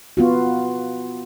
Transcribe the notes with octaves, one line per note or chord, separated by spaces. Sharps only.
B3 F4 F#4